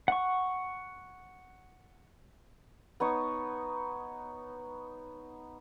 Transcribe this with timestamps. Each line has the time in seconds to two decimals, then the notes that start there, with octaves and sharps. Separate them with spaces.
0.08 F#5 C#6
3.00 B3 D#4 C#5